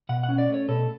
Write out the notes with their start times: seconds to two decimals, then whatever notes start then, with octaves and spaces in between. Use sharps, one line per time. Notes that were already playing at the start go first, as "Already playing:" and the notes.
0.09 B2 F#5
0.23 F#5
0.29 C#4
0.38 D5
0.49 A3 C#5
0.68 B2 A4